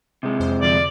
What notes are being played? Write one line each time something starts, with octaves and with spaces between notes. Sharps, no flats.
C3 G#3
F2 C5
F2 D3 F3 D5